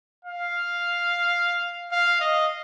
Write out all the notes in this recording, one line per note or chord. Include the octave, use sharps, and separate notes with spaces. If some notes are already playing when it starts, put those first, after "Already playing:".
F5
F5
D#5